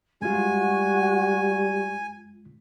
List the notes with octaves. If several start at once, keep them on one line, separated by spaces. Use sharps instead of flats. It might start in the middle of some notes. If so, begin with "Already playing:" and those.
F#2 G3 G#3 F4 F#4 G#5